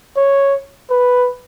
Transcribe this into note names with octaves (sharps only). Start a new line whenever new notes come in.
C#5
B4